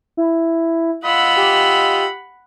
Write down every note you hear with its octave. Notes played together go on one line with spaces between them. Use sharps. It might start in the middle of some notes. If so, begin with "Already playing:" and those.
E4
F4 D#5 F#5 B5 E6
G4